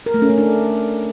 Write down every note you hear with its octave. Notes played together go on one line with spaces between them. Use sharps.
A#4
A3
C#4
A3
D4